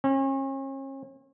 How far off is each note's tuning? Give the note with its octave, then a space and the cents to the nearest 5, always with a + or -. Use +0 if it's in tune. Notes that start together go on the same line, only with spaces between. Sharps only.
C#4 -40